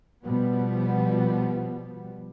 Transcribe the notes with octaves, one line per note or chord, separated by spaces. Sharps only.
B2 F3 G3 B3